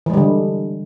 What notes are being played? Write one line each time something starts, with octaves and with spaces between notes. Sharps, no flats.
D3 E3 G3 G#3